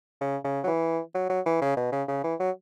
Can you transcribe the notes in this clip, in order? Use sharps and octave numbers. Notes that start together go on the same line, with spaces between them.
C#3
C#3
F#3
E3
F#3
F#3
E3
C#3
B2
C#3
C#3
E3
F#3